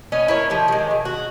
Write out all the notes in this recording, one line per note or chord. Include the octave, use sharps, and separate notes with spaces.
C#4 B4 D#5
E4 A#4 C#5
F3 G4
D#3 G#3
B2
F#4